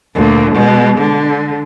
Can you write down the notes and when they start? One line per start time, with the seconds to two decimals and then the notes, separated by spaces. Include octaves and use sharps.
0.15 D2 A#2
0.54 B2 G#3
0.97 D3